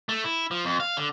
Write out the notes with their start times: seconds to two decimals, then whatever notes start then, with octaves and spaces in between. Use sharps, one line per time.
0.09 A3
0.24 E4
0.51 F3
0.65 F2
0.80 F5
0.97 D3